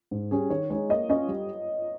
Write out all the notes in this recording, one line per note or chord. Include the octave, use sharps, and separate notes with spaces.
G#2
G3 C#4 G#4
D#3 C#5
G#3 D#4 G#4 C#5
A#3 D#5
C#4 F4 D#5
G3